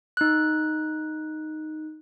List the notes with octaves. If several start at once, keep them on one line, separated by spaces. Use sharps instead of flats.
D#4 F#6